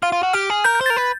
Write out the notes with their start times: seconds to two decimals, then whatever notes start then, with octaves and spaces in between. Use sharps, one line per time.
0.02 F4 F6
0.12 F4
0.23 F#4
0.33 G4 F6
0.50 G#4
0.64 A#4 G6
0.75 G6
0.81 C5
0.86 A#4 A6
0.97 B4